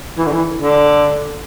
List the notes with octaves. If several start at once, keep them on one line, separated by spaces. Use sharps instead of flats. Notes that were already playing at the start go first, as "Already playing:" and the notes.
E3
D3
E3
D3